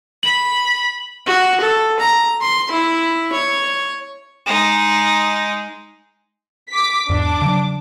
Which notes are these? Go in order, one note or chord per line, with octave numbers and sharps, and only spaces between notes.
B5 F#7
F#4
A4
A#5
C6
E4
C#5
G#3 D#4
D6 B6
E2 G#2 D4 D6
C#3 F#3